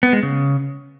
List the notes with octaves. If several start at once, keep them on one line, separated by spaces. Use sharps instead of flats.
B3
G#3
C#3